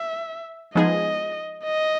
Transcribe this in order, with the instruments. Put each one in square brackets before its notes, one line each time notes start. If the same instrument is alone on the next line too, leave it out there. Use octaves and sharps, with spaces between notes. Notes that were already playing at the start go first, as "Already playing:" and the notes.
Already playing: [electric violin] E5
[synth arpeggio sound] F3 G#3 B3 D#4 G#4 [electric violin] D#5
[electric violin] D#5